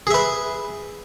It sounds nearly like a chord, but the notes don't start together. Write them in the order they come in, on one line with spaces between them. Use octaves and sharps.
G#4 E5 B4